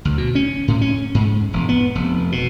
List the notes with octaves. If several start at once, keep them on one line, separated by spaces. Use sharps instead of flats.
D2
B2
C#4
A2
C#4
G#2
E1
B3
F1
B2